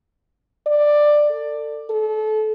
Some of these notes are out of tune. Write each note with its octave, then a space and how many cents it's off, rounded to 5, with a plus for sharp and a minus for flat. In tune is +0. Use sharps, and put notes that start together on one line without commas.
D5 +10
A4 +30
A4 -30